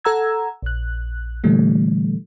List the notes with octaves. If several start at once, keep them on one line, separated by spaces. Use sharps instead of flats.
A4 F#5 A#5 E6 G#6
A#1 F#6
A#2 D3 E3 G3 A3